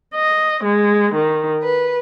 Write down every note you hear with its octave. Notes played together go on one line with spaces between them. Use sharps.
D#5
G#3
D#3
B4